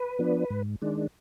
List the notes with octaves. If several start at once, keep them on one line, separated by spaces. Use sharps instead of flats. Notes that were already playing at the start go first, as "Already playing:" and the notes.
Already playing: B4
F3 B3 D4
G#2
D#3 G#3 D4